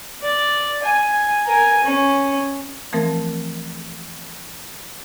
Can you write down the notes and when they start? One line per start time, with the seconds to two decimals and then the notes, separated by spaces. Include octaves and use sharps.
0.23 D5
0.83 G#5
1.46 A#4 G#5
1.84 C#4
2.93 E3 F3 A3 C4 A#4